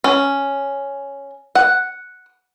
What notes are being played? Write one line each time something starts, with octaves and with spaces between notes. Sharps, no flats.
C#4
F#5